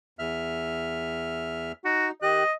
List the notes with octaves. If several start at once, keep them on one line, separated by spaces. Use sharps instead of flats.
E2 E5 F6
D#4 F#4
D#3 G4 D#5 F#6